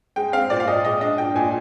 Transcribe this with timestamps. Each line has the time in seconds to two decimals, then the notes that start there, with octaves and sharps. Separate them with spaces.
0.16 G#3 G5
0.33 C4 F5
0.50 A#2 D5
0.60 F5
0.67 A#2 D#5
0.85 G#3 D#5
1.01 D4 D#5
1.18 A#2 G5
1.35 A#2 G#5